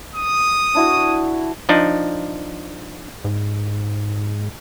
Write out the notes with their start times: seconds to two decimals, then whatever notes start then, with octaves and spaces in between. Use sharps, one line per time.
0.15 D#6
0.75 D4 E4 F#4
1.69 F3 D4 D#4
3.25 G#2